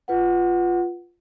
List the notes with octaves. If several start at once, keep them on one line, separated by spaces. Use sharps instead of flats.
F4 B4 F#5